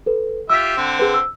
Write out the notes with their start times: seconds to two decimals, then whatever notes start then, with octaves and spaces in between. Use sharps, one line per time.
0.06 A4 B4
0.50 F4 G4 E5 E6 B6
0.77 D3 C4
0.99 G#4 B4
1.14 E6